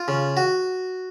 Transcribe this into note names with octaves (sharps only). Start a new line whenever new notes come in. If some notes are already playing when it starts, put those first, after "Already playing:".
Already playing: F4
C#3
F#4